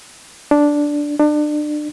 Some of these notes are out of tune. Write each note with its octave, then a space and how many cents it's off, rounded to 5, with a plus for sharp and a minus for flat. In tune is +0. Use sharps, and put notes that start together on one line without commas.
D4 -5
D4 +30